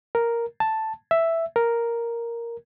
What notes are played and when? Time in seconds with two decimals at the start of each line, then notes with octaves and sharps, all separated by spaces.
0.15 A#4
0.60 A5
1.11 E5
1.56 A#4